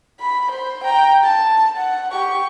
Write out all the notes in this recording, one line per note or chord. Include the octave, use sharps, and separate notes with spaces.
B5
C5
G5 A#5
A5
F#5
G4 C#6